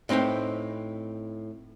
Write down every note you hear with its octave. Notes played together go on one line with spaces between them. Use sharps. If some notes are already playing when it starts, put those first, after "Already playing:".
A2 C4 D#4 B4 G5